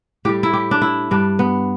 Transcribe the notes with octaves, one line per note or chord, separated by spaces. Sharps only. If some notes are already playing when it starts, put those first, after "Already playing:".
A2 G3 G4
E4
G4
D4
E4
G2 G3 D4
B3